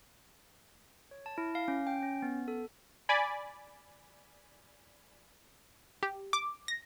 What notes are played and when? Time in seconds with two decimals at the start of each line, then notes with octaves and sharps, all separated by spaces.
1.11 C#5
1.26 A5
1.38 E4
1.55 F5
1.68 C#4
1.87 G5
2.03 C#4
2.22 B3
2.48 A4
3.09 D5 G#5 B5
6.03 G4
6.33 D6
6.68 A#6